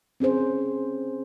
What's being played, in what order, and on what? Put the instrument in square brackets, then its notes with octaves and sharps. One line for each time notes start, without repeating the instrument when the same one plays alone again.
[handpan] C4 C#4 G#4 C5